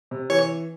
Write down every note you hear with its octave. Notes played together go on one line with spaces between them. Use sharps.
C3
E3 C#5